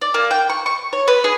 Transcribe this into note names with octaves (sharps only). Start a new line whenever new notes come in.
D5
A#3
G5
C#6
C#6
C#5
B4
G#4